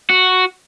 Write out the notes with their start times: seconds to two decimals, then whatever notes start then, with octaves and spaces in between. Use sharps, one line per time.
0.10 F#4